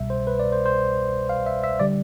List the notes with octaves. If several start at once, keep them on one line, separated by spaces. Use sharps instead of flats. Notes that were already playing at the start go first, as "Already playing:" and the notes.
Already playing: C2 B2 G3 E5
C5
B4
D5
C5
C5
F5
E5
E5
D3 G3 D5